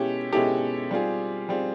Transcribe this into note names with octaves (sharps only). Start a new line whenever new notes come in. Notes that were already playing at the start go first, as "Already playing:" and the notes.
Already playing: B2 G#3 C#4 E4 G4 A4
B2 G#3 C#4 E4 G4 A4
G3 C4 F4 G#4
G3 C4 F4 G#4